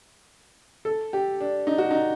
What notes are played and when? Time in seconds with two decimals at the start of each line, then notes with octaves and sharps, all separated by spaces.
0.85 A4
1.13 G4
1.41 D4
1.67 D#4
1.78 F#4
1.91 D#4